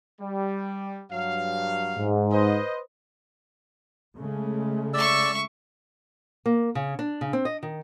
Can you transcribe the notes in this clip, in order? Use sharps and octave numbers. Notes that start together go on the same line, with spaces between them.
G3
G2 F#3 F5
G#2
B4 C5 D#5
C#3 G#3 A3
D5 E5 C#6 E6
A#3
C#3
D4
C#3
C4
D#5
D#3